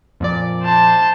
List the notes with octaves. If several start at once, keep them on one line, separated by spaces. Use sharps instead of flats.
F2 A#2 D5
C5 A5